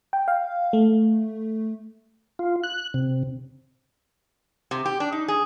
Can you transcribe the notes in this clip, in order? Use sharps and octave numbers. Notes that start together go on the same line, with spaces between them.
G5
F5
A3
F4
F#6
C3
C3
G4
D4
D#4
G#4